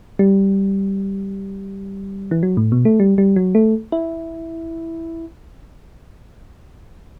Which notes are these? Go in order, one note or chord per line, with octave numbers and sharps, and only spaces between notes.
G3
E3
F#3
A2
B2
A3
G3
G3
F#3
A3
E4